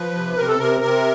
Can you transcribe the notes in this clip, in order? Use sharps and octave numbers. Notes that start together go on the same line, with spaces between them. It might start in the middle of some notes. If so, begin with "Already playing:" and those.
Already playing: F3 B4
C3
C3 A#4
A4
C3 A#4
C3 A#4